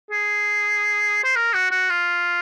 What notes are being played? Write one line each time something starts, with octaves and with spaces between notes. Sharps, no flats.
G#4
C5
A#4
F#4
F#4
F4